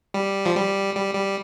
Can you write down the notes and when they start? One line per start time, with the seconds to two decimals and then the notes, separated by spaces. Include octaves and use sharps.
0.14 G3
0.45 F3
0.55 G3
0.95 G3
1.15 G3